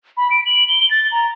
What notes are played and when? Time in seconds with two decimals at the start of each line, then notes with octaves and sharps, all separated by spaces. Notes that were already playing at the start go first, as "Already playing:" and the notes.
0.17 B5
0.31 D7
0.46 F#7
0.68 G7
0.91 A6
1.11 A#5